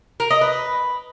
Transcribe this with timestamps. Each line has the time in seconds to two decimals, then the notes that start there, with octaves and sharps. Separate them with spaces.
0.20 A#4
0.31 D#5
0.41 B4